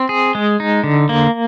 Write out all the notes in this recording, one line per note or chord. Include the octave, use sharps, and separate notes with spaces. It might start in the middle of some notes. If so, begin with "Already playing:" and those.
Already playing: C4
G#4
G#3
D#4
D3
A#3